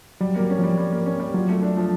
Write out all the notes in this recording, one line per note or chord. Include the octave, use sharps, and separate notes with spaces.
F#3 G3
F#3 A#3
C#4
F3
G3
G3
A#3
C#4
G3
F#3 F4
A3
D4
F3